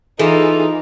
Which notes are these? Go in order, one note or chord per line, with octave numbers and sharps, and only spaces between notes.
E3 D#4 F4 G#4 A4